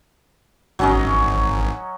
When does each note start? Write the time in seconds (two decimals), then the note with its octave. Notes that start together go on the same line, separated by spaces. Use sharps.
0.79 G#1 F#3 C#4 D#5